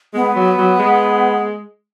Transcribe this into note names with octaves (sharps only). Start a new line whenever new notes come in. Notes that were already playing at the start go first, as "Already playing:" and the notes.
G#3 B3
F#3
F#3
G#3